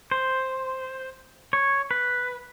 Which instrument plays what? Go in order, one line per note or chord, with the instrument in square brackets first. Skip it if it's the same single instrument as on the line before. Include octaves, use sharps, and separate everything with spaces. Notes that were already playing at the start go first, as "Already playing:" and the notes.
[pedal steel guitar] C5
C#5
B4